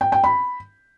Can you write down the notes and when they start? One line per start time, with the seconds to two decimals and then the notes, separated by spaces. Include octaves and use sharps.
0.01 G5
0.12 G5
0.24 B5